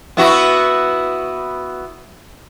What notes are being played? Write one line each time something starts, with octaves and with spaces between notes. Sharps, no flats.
B3 E4 F#4